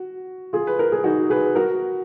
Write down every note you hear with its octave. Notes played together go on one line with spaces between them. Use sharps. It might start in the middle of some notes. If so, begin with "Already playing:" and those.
Already playing: F#4
F4 G#4
B4
A#4
G#4
D#4 F#4
G#4 B4
F#4 A#4